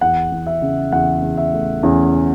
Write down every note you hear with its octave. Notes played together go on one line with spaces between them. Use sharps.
E2 F#5
E2
E5
C#3
E2 F#5
E2
E5
A3
E2 C#4